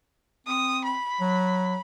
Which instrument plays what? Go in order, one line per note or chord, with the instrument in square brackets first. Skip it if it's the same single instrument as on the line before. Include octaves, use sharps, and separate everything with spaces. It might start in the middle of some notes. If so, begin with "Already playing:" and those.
[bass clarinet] C4 [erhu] D#6
[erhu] B5
[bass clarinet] F#3